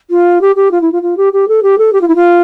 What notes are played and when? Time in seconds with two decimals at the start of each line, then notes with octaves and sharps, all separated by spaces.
0.10 F4
0.41 G4
0.56 G4
0.71 F4
0.81 E4
0.92 F4
1.02 F4
1.17 G4
1.33 G4
1.48 A4
1.63 G4
1.78 A4
1.93 G4
2.01 F4
2.08 E4
2.16 F4